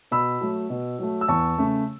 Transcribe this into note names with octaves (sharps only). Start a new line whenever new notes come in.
B2 B5 E6
F#3 A3
B2
F#3 A3
E6
E2 A5 C#6
C#3 A3